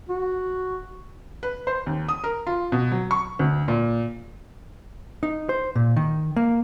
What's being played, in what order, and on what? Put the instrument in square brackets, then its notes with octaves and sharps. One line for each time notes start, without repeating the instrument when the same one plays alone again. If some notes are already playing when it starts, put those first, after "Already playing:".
[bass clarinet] F#4
[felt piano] B4
C5
D#2
D#6
A#4
F4
B2
F#3
C#6
D2
A#2
[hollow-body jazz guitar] D#4
C5
A#2
D#3
A#3